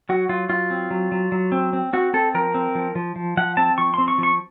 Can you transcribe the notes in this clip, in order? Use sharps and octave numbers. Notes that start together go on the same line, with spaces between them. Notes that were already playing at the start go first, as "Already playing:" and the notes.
F#3 F#4
F#3 F4
F#3 F4
C4
F#3
F#3
F#3
C4
C4
C4 F#4
C4 A4
F3 A#4
C4
F3
F3
F3
F3 F#5
C4 A5
F3 C#6
C4 C6
C#6
F3 C#6